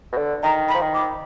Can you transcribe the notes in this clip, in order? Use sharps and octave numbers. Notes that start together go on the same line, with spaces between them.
B2
D3
D#3 A#5
B5
F3
D#3
D6